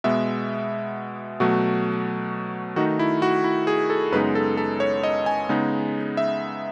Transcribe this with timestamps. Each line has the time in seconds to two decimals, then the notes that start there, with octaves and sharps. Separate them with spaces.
0.04 B2 G#3 B3 E5
1.40 B2 F#3 A3 F#4
2.76 D#3 A3 D#4 F#4
2.99 E4
3.22 F#4
3.44 E4
3.67 G#4
3.90 A4
4.12 F#2 C#3 G#3 B3 D#4 B4
4.35 A4
4.57 A4
4.80 C#5
5.04 D#5
5.26 G#5
5.49 C#3 G#3 B3 D#4
6.17 E5